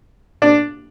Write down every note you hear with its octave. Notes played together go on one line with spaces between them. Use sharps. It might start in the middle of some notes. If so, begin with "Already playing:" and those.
D4